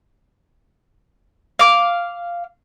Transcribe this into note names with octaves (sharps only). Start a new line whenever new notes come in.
F5 D6